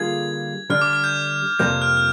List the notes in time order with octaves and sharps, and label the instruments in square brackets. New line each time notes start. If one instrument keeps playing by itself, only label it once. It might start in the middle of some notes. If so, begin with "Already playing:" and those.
Already playing: [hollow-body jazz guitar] D3 G3 A#3 F4 G#4 [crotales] G#6
[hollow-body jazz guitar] D3 G3 D4 [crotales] F6
[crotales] D6
F6
G6
[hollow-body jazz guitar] F2 C3 G3 A#3 [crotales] G6
[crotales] F6
F6